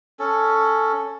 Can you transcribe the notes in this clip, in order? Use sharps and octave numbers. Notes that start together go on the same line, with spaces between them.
C#4 A4